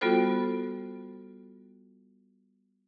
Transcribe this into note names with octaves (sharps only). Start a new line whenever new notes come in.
G3 B3 F4 F#4 A4 C5